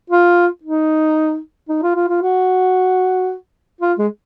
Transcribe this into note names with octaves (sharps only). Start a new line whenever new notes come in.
F4
D#4
D#4
F4
F4
F4
F#4
F4
G#3